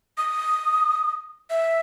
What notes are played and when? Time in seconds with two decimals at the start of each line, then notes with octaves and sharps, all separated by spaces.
0.18 D#6
1.50 E5